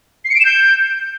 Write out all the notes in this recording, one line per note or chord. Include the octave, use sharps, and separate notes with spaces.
C7
C#7
D7
E7
G6